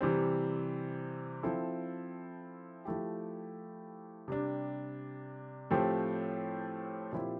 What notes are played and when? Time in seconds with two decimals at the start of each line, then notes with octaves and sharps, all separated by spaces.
0.01 C3 E3 G3 C4
1.43 F3 C4 E4 A4
2.85 F3 A3 E4 G4
4.28 C3 G3 D4
5.71 A2 F3 A3 C4 G4
7.13 A#2 F3 C4 E4 G4